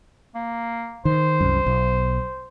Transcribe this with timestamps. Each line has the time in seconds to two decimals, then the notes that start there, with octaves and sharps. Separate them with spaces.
0.35 A#3
1.05 D#3 C5
1.41 C2 F#2
1.66 B1